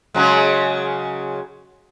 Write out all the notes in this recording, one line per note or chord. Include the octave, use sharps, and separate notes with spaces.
C#3 F#3 G#3